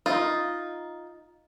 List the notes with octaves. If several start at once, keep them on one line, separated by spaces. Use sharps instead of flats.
D#4 F4